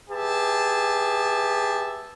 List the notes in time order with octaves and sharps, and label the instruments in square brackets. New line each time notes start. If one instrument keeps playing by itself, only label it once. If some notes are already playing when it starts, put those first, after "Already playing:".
[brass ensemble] G4 G#4 B4 E5 A5